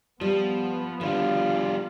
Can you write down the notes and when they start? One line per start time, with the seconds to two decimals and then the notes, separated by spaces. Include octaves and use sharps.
0.21 F3 G3 B3
1.01 D3 F3 G3 F4